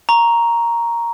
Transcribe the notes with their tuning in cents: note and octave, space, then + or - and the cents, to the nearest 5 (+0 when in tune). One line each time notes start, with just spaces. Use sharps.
A#5 +0 C#6 +0